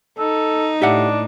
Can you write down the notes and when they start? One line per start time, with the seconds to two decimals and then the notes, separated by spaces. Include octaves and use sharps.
0.19 D#4 A4
0.82 A2 D4 G4 E5 F#5